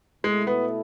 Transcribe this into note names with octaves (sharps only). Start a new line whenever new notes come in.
B2 G#3 A3 E4 A4
B3